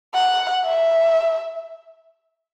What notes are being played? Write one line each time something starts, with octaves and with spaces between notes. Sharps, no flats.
F#5
E5